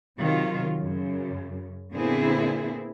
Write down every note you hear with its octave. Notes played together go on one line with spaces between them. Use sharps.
C3 D#3 F#3 F4
F#2 C#3
A#2 D3 B3 C4 E4 G#4